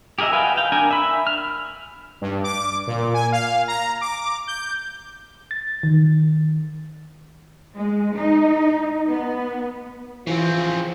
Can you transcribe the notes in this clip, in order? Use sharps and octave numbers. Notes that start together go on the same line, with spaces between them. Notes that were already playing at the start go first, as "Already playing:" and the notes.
G4 G#4 A#4 D#5 E5
F#4 B4 F5 G5 G#5
F5 G5
D4 A#4 G#5
E5 B5
F6
G2
D6
A#2
G#5
F5
A#5
D6
G6
A6
D#3
G#3
D#4
B3
C#3 E3 F3 C4